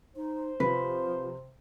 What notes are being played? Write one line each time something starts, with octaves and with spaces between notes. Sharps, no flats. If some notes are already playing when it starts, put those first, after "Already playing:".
D#4 C5
C3 F3 B4